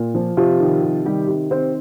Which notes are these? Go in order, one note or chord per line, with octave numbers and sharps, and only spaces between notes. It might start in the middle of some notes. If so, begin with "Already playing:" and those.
Already playing: A#2
F3
C3 F3 F4
D#3
C3
D#3 G3 G4
C3
D#3 C4 C5